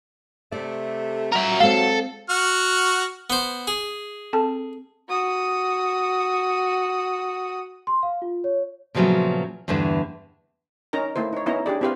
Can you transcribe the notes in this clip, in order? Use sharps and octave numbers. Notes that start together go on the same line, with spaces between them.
C3 A3 D5
A#2 F#3 A#4 E5
G#3 C4 A4 F5
F#4 F#5 F6
B3 C5
G#4
C4 A4 A5
F#4 D#6
C6
F5
F4
C#5
A#2 C#3 F3 F#3 A3 B3
E2 G2 D3 E3 A3
C#4 D#4 A#4 A#5
A3 A#3 E4 C5
D#4 C#5
B3 C#4 D#4 E4 A#5
D4 G4 G#4 D5
C4 E4 G4 B4 C5 F5